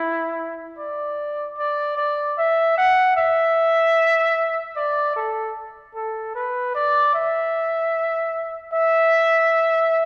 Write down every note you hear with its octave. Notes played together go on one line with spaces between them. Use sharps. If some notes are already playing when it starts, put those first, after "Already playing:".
Already playing: E4
D5
D5
D5
E5
F#5
E5
D5
A4
A4
B4
D5
E5
E5